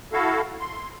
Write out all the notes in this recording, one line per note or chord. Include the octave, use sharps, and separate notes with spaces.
E4 F#4 A4 F5
C6